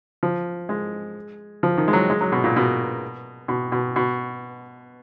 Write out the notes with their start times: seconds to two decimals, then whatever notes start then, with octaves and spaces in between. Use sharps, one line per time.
0.23 F3
0.69 G#3
1.63 F3
1.77 D#3
1.88 G#3
1.93 F#3
2.10 G#3
2.21 F#3
2.32 B2
2.44 A#2
2.56 B2
3.48 B2
3.72 B2
3.96 B2